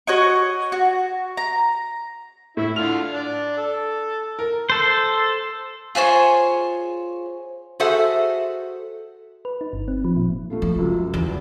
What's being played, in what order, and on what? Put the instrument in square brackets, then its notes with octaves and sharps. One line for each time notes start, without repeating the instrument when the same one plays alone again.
[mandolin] F#4 C#5 D#5 C#6
F#4
A#5
[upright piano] A2 [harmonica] E4
[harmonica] D3 F4 F6 [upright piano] F7
[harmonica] D4 D5
A4
[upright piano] A#4
[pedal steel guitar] A4 C5
[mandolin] F4 G#4 C5 C#5
[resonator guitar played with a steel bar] F#4 G#4 A4 C5 E5 F#5
[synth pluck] B4
D#4
G1
C4
F3
A#2
[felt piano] A3 F4 A4
[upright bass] F3
[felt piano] C#2 F#2
[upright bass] E2